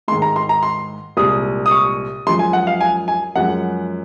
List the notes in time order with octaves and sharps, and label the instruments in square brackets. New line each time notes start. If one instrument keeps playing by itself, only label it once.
[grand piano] G#2 D#3 G#3 C6
A#5
C6
A#5
C6
C2 A#2 G#3 D#6
D#6
C#6
F#2 F3 G#3 C6
G#5
F#5
F5
G#5
G#5
F#2 F3 G#3 F#5